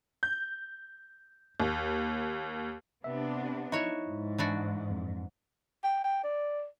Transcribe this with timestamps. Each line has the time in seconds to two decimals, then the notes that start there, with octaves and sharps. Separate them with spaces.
0.23 G6
1.60 D#2
3.04 C3 B3 D4 E5
3.72 F3 D#4 E4 F#4 C#5 E5
4.06 G#2
4.38 E3 D4 F#4
4.90 F2
5.84 G5
6.04 G5
6.24 D5